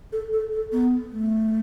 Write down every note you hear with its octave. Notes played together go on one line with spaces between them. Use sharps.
A4
A4
A4
B3
A3